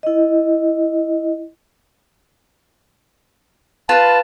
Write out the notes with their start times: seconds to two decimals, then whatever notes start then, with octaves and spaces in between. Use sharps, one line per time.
0.03 E4 D#5
3.89 F4 B4 A5